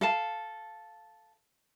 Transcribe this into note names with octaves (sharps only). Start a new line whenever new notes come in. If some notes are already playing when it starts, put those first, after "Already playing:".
A4 F5 A5